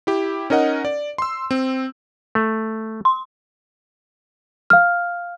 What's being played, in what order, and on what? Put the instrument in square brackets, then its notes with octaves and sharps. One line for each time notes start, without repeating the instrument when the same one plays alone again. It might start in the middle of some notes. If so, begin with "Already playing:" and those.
[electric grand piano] E4 G4
C#4 D#4 A#4 D#5 F#5
D5
C6 E6
C4
[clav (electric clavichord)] A3
[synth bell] C6
[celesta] F5 F6